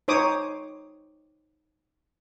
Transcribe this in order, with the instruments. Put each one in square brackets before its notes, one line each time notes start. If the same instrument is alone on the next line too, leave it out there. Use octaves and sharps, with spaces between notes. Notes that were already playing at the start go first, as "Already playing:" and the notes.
[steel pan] D#4 C5 C#5 D6 D#6